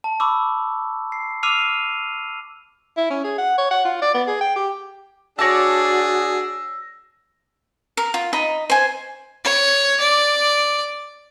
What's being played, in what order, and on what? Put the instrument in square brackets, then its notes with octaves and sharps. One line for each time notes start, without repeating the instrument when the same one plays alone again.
[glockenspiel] A5
B5 C#6 D6 E6
C7
D6 E6 F6 C7 D#7 F7
[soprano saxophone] E4
C#4
G#4
F#5
C#5
F#5
F4
D5
B3
G#4
G5
G4
[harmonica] D4 G#4 [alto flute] F#4 [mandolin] C#5 D5 A5 [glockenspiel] E6 A#6
[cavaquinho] A#4
F4
D#4 D#5 B5
C5 G#5
[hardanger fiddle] C#5
D5